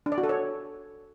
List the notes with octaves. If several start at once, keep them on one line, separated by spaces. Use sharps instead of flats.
D4
D5
F#4
A4
C#5